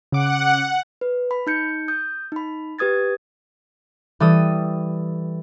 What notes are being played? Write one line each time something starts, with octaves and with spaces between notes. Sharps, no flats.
C#3 F#5 D6
B4
B5
D#4 G6 C#7
D#6 G6
D#4 B5
G4 B4 D#6 G#6 A6
E3 G3 A4 D#6